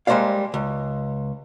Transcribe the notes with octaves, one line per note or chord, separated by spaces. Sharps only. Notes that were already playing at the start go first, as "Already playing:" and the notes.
G3 G#3 A#3 C5 D5 F5
C#2